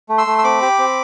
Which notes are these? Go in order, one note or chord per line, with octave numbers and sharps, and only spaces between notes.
A3
C6 E6
A3
E6
C4 B5 D6
G4
C4